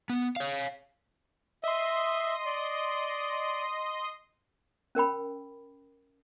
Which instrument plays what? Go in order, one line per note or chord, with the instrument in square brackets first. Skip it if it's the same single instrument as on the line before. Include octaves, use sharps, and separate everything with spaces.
[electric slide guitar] B3
C#5 F5
[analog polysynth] D#5 C6 [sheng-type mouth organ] E5
[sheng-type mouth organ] D5
[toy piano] C#4 A#4 G5 B5